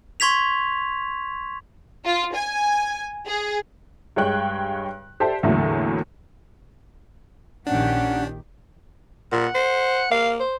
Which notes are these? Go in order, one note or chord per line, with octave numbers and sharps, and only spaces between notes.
C6 C#6 G#6 B6 F7
F4
G#5
G#4
G2 G#3 C#5 G5 F#6
G4 A4 C5 D5 E5 A5
E2 A2 D3 F#3 A3 A#3
A#1 D#3 C#4 D4 G4 F#5
A#2 F#5
C5
A#3 F5
C5